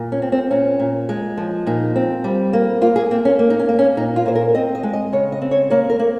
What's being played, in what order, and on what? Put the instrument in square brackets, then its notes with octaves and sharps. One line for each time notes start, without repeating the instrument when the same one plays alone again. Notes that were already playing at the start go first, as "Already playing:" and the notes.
Already playing: [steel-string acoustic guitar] A#2
C#4
C4
C4
A#2 C#4
A#2
G#3
F3
A#2 D#4
C4
G3
A#3
A#3 F4
G#4
A#3 C4
C#4
A#3
D#4
C#4
A#3
C#4
A#2 D#4
F4
A#2 C5
A#4
C4 D#5
D#5
G#3
D#5
C#3 C#5
D#5
C4
C#5
A#3 C#5
A#4
A#3